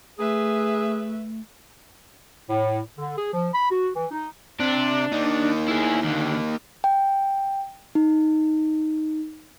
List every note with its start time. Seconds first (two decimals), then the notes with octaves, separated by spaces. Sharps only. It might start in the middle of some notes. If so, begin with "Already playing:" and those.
0.19 A3 G#4 B4 E5
2.49 A2
2.97 D3
3.17 G#4
3.33 F3
3.53 B5
3.70 F#4
3.95 E3
4.11 D#4
4.60 C3 D4
5.12 A#3 D#4
5.68 E4 G#4
6.04 D#2 D3
6.84 G5
7.95 D#4